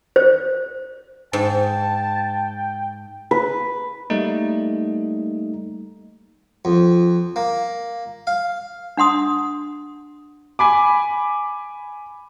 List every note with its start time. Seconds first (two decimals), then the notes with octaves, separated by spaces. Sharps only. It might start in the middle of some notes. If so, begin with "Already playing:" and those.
0.16 C5
1.33 G#2 G5 A5
3.31 B4
4.10 G3 A3 A#3 D#4
6.65 F2
7.36 A#3
8.27 F5
8.97 D4 F#5 C6 D#6
10.59 G#5 B5 D6